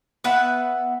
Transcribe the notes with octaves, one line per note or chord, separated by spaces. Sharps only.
B3 B4 E5 F#5